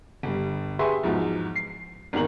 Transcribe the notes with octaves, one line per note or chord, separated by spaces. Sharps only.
G1 G3
G4 G#4 B4 E5 C6 C#6
E2 G#2 F3 F#3
C7
G#1 E2 D#3 A#3 A#5 F#7